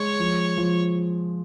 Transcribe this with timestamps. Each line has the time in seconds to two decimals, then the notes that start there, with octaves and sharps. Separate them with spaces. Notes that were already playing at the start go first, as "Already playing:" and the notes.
Already playing: G#3 C#5
0.19 F3
0.57 F3